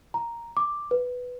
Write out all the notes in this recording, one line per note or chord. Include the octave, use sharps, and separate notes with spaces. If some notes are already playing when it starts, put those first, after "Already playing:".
A#5
D6
B4